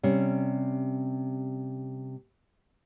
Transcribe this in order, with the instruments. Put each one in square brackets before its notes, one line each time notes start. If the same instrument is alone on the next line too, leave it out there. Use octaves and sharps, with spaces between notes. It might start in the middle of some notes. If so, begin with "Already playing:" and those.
[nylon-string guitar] C3 G3 C#4